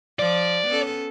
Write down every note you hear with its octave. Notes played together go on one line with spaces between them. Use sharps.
F3 D5
B3 C#4 A4